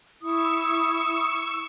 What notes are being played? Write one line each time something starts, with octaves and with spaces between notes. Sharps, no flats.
E4 C#6 D#6 E6